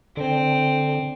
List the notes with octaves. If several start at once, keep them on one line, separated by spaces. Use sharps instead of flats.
D3 C4